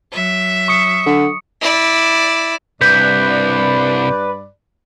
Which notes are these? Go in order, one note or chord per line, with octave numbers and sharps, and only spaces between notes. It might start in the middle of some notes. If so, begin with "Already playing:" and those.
F#3 E5
C#6 D#6 C#7
D3
E4 D5
C2 G2 B4 D5 G6 B6